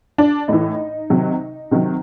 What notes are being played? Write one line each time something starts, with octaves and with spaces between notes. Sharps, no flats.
D4
A2 E3 D#4
C3 D#3 F#3
C3 D#3 F#3